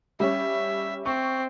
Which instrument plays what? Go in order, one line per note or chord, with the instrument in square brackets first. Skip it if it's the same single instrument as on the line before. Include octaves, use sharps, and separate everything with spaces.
[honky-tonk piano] G3 C#4 [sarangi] E5
[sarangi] C4 [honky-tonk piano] C#6